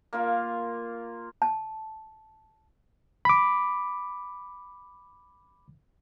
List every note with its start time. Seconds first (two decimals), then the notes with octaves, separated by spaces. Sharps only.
0.13 A#3 F4
1.42 A5
3.25 B5 D6